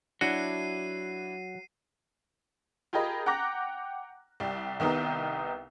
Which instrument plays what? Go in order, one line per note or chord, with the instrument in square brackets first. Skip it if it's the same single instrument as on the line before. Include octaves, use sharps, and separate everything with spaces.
[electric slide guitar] F#3 [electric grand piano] D4 E4 E5 [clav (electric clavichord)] F#4 [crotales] C7 D#7
[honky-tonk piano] F4 G4 G#4 A#4 D#5 B5
F#5 G5 A#5 D6 F#6 A#6
C2 G3
C2 D#3 B3 D#4 G4